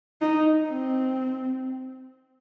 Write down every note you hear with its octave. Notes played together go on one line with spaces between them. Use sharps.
D#4
C4